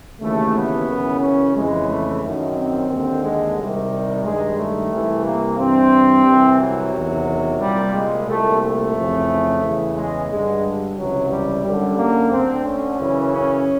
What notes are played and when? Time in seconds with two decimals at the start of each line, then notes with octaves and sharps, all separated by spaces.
0.20 D#2 C#3 E3 A3
0.55 B3
0.88 F#2 C#3 E3
1.21 C#4
1.54 F2 C#3 E3 G#3
1.88 A3
2.22 F#2 D#3
2.55 C4
2.89 D#2 D3
3.24 G#3
3.56 C2 C3 D#3 G3
4.24 G2 D#3 G#3
4.58 A3
4.91 C2 C3 E3
5.25 A#3
5.58 G2 E3 C4
6.26 C2 C3 E3
6.60 F#3
6.93 E2 C3 D#3
7.60 C2 A#2 G3
7.93 G#3
8.27 C2 A#2 A3
8.61 A3
8.95 F2 C#3 E3
9.63 E2 C#3 E3
9.96 G#3
10.29 G2 D3 G#3
10.97 C#2 C3 E3 F#3
11.30 G3
11.64 F#2 D3 G3
11.97 A#3
12.31 D2 D3 C4
12.65 C#4
12.99 F#2 C#3 E3
13.32 C#4